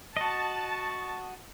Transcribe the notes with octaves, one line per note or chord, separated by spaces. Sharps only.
F#4 D#5 A5